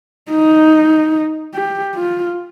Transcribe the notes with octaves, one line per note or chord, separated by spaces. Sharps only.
D#4
G4
F4